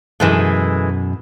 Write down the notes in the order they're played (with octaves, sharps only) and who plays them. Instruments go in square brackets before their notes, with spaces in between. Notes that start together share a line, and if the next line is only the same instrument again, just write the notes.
[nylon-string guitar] F#2 B2 [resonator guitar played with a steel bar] E3 G#3 A3